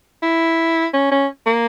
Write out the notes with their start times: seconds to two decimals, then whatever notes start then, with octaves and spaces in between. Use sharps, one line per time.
0.23 E4
0.94 C#4
1.11 C#4
1.47 A#3